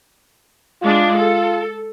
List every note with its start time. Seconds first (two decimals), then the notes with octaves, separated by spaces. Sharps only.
0.82 G#3 D4 F4
1.18 A4